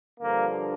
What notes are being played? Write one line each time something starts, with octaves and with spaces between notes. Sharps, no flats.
G2 D3 F3 A#3